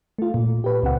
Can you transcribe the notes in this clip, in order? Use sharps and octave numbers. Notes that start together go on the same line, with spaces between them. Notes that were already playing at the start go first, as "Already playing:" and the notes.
A3 F4
A#2
G4 B4
C#2 C4 F#5